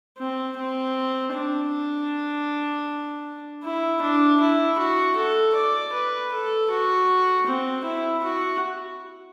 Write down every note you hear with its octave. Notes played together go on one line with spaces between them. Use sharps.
C4
C4
D4
E4
D4
E4
F#4
A4
D5
B4
A4
F#4
C4
E4
F#4